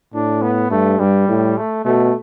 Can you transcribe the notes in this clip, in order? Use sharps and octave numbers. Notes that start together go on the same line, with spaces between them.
A2 D4
B3
G2 A3
G2 G3
A2
A3
B2 A3